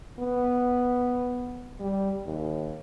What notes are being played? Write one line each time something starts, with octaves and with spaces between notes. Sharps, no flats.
B3
G3
D#2